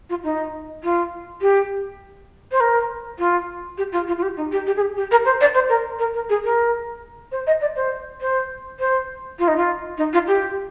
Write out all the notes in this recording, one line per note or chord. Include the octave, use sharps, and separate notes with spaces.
F4
D#4
F4
G4
C5
A#4
F4
G4
F4
F4
F4
G4
D#4
G4
G4
G#4
G4
G4
A#4
C5
D5
C5
A#4
A#4
A#4
G#4
A#4
C5
D#5
D5
C5
C5
C5
F4
D#4
F4
D#4
F4
G4